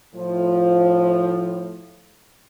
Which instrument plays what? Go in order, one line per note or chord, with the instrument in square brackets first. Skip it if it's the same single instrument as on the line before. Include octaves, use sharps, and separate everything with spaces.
[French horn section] A2 F3